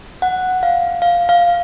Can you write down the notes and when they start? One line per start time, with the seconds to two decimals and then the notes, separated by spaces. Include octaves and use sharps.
0.22 F#5
0.63 F5
1.02 F5
1.29 F5